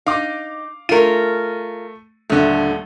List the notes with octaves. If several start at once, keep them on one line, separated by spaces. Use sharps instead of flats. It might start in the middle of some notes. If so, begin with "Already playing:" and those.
D#4 F5 D6
A3 F4 A#4 D#7
D#1 D3 A3